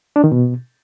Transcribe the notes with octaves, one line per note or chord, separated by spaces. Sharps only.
D4
D#3
B2